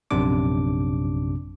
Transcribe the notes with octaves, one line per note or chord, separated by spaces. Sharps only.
A#1 F#2 C3 D4 D6